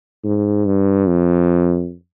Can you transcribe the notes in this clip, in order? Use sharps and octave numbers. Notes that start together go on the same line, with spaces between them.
G#2
G2
F2